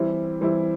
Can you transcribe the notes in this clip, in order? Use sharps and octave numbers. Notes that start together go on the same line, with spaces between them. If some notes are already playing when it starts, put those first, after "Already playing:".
Already playing: E3 G3 C4 E4
E3 G3 C4 E4